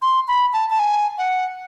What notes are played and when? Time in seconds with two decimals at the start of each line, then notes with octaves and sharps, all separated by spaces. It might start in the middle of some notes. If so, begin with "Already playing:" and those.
0.02 C6
0.28 B5
0.53 A5
0.70 A5
0.79 G#5
1.18 F#5